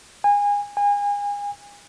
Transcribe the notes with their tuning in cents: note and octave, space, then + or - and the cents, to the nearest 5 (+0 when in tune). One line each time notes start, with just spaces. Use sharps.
G#5 -25
G#5 -30